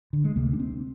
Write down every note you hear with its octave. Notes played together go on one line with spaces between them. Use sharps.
D3
G#3
D2 C3 A#3
D4
C4